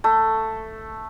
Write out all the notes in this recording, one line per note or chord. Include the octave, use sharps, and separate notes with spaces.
A3